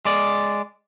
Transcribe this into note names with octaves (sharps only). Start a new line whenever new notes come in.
G#3 D5